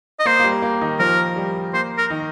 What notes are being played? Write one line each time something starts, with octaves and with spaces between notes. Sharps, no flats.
D#5
A#3 C5
A#3
G3
A#3
D#3 D#4
F3 F4 A#4
G3
A#3 C5
A#4
D#3 D#4